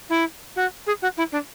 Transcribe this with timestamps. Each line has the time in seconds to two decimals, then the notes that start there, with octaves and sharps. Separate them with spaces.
0.09 E4
0.55 F#4
0.86 G#4
1.01 F#4
1.17 E4
1.32 D4